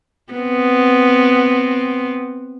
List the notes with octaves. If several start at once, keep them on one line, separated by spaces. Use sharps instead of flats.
B3 C4